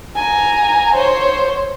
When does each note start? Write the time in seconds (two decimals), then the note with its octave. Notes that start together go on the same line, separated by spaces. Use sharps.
0.16 G#5 A#5
0.96 C5 C#5